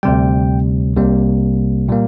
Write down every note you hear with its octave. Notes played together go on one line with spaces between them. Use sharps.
D2 C3 G3 G5
C2 C3 G3 A#3
A#2 G3 A#3